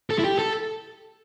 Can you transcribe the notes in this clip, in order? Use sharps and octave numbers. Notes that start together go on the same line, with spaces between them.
A4
E4
G4
A4